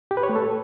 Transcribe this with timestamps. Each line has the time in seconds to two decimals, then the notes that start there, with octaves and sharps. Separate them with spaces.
0.11 G4
0.17 B4
0.23 C#5
0.29 A3
0.36 A4